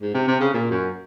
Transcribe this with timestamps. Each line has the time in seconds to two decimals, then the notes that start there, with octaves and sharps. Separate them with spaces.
0.01 G#2
0.14 C3
0.27 C3
0.40 C#3
0.54 A#2
0.71 F#2